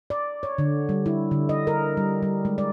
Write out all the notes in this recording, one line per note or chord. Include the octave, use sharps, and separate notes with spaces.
D5
C#5
D3
G3
E4
D3
D#5
A#4
G3
G3
G#3
D5